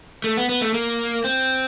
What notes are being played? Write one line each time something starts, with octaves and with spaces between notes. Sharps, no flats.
A3
B3
B3
A3
A#3
C4